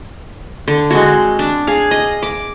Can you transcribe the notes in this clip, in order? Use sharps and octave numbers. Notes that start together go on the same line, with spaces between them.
D3
G#3 C4 F#4
D4
G#4 F5
D#5
D6